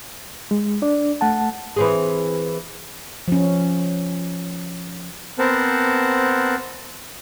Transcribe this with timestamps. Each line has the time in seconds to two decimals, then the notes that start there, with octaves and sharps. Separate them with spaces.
0.51 G#3
0.82 D4 D5
1.21 A3 F#5 A5
1.76 E3 C4 G#4
3.28 F3 C#4
5.39 B3 C4 A#4 C5 F#5 A5